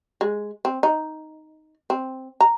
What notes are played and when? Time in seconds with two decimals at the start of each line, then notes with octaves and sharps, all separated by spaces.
0.21 G#3
0.65 C4
0.83 D#4
1.90 C4
2.41 A#5